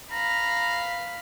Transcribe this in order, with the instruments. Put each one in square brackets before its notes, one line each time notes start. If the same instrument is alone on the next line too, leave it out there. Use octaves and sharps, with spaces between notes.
[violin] F5 B5 [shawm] A#5